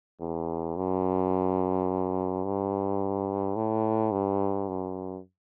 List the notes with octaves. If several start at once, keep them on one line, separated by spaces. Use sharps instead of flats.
E2
F#2
G2
A2
G2
F#2